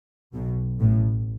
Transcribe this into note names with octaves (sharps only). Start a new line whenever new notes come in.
B1 B2
A1 A2